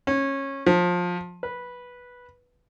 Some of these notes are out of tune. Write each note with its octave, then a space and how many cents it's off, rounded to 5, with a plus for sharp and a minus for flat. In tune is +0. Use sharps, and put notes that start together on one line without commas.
C#4 -20
F3 +20
B4 -10